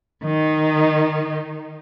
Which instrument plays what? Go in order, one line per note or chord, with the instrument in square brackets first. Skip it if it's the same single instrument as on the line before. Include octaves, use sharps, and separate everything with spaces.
[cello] D#3 D#4